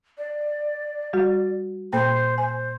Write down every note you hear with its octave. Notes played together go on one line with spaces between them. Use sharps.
D5
G3 F#4
A#2 A#3 C5 G5
C5 G#5